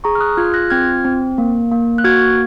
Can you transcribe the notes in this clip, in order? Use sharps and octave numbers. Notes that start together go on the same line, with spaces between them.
G#4 A#5 C#6
F6
D#6 F#6
F4 F6 G#6
F#6 A#6
C4 F6 G#6
C4
A#3
A#3
F#6
F#4 F6 G#6